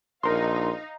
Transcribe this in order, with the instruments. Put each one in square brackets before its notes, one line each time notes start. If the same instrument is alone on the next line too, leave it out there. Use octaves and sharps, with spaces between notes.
[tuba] A#1 [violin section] D#4 F5 A#5 [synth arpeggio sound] A#4 C6